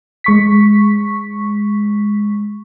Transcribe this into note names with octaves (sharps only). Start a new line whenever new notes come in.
G#3 C#6 B6